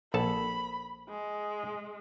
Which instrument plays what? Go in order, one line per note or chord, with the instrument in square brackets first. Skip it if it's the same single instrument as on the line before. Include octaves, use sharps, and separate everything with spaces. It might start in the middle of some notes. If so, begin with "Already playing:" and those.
[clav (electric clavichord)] A#1 A4 A5 [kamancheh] B5
[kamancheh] G#3